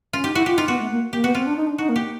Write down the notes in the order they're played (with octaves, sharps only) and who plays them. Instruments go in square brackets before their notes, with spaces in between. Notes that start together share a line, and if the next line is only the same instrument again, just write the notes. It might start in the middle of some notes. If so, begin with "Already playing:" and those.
[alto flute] C#4 [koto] F4
[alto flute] D#4 [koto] G4
[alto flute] E4 [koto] F#4
[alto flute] F4 [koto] G4
[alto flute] D#4 [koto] F4
[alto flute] B3 [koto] F#4
[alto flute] A3
A#3
[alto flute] A#3 [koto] G4
[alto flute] B3 [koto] F#4
[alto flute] C4 [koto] F4
[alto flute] D4
D#4
D4
[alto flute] D#4 [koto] F#4
[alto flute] A#3
[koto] G4